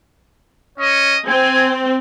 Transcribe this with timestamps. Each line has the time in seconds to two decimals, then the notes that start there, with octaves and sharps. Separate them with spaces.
0.79 C#4 C#5 D#5
1.27 C4 G#5